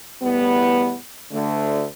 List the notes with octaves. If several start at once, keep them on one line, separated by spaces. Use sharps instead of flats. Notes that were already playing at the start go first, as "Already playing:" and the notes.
E2 A2 G3 B3
D2 D3 A3